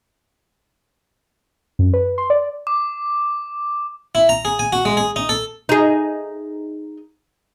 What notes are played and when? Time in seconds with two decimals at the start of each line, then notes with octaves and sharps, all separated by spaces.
1.79 F#2
1.93 B4
2.18 C6
2.30 D5
2.67 D6
4.15 E4
4.29 A#5
4.45 G#4
4.59 G#5
4.73 F#4
4.85 G#3
4.97 G#4
5.16 D#4
5.29 A4
5.69 D#4 G#4